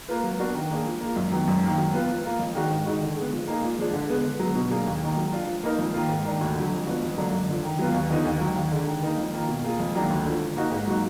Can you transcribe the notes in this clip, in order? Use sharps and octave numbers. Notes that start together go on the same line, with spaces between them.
A#3 F4 B4
F#3
B3 D4 F#4 A#4
D#3
A#3 D4 G#4
F3
A#3 F4
F#2
D#3 F#3 B3
F#2
D#3 A#3
F#3
B3 F4 B4
F3
A#3 F4
F2
D#3 G#3 D4 F#4
G#2
D#3 G#3 D#4 F#4
D3
G#3 B3
F3
A#3 D#4 G#4
A#2
F3 G#3 D4
D3
G#3 B3
D3
F#3 B3
B2
F#3 A#3 D4 G#4
D#2
D#3 A#3 D#4 G#4
F#3
D4 F4
F3
A#3 D#4 A#4
F2
D#3 A#3 F4
G#2
D#3 A#3 D4
D2
D3 F#3
F2
F3 B3 D4 F#4
F2
D3 F#3 A#3 D4
F#2
D3 F3
D#3
F#3 B3 F4
D#2
D3 F3 B3 D#4
D#2
D#3 F#3
D#2
D3 G#3 D4
D#3
A#3 D#4 A#4
F2
D#3 A#3 F4
B2
A#3 F4 G#4
F2
D#3 F#3 A#3 D4
D2
D3 F3
F3
A#3 D#4 F#4
G#2
F#3 A#3 D#4 F#4